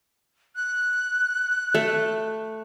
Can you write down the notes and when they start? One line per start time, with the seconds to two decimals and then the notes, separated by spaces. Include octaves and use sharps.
0.56 F#6
1.74 A3